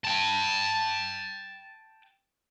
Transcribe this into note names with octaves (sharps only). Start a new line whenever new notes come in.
G5 A5